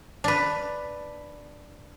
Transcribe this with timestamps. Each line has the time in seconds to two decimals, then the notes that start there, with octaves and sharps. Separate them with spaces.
0.24 D4 B4